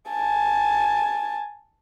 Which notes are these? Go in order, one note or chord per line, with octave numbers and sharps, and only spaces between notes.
G#5 A5